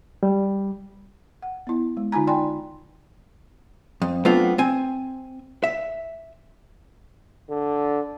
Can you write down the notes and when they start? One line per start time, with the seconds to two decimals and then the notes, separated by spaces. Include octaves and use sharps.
0.23 G3
1.42 F#5
1.67 B3 E4
1.97 G#3
2.12 D3 D#4 F4 G#5 A#5
2.27 D5 G5 G#5 B5 C6
4.02 F2
4.25 F#3 A3 B3 C4 D4 F4
4.58 C4 G#5
5.64 E5
7.49 D3